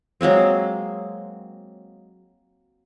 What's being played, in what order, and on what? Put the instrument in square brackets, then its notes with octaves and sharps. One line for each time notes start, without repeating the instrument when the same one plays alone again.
[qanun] F#3 G#3 A#3 C4